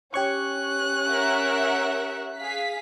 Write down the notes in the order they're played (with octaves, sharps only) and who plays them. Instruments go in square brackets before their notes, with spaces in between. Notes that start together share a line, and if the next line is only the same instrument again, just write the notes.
[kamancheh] C#4 F#6 [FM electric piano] G4 C#5 C#6
[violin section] A#4 E5 F#5
G#4 F5 B6